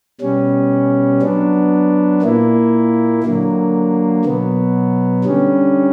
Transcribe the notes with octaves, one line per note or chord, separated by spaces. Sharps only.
B2 G3 C#4
F#3 B3 D4
A#2 A#3 E4
D3 F#3 A#3
B2 F#3 B3
D3 G3 C#4